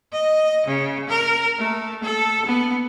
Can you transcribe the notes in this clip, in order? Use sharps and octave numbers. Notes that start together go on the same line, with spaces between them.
D#5
C#3
A#4
A3
A4
B3